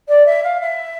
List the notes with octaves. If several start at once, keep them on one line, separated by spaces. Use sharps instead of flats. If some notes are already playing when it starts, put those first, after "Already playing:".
D5
E5
F5
E5